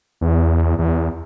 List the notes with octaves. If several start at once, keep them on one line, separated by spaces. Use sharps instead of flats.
E2
E2